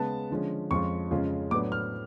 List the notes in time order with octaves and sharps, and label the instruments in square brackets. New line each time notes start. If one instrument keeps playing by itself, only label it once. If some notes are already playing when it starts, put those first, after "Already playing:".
Already playing: [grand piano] C#3 G#3 B3 A5
D3 F3 G#3 C#4
F2 F3 G#3 C#4 F4 C#6
F2 C#3 G#3 C#4 F4
A2 F#3 B3 D4 D6
F6